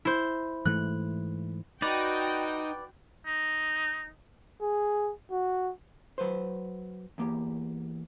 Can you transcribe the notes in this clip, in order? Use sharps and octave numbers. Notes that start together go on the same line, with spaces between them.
E4 C5
G#2 E3 A3 F#6
D#4 F#4 B4 D5 G5
D#4
G#4
F#4
F#3 B4 C5
E2 A#3 G4